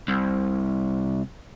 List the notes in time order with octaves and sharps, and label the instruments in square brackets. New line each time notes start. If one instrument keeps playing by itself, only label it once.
[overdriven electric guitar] C2